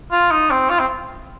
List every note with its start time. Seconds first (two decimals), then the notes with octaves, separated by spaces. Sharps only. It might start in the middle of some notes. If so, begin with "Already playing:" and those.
0.12 F4
0.31 D#4
0.51 C4
0.70 F4
0.79 C4